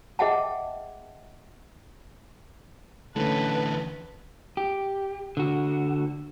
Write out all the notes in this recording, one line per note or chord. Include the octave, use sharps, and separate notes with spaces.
G#4 D#5 E5 F#5 G5 A5
D3 E3 A3 C#4 B4 A5
G4
D3 F#4